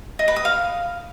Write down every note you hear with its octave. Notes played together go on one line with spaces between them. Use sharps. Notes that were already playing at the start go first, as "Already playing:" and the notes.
D#5
B4
D#6
F5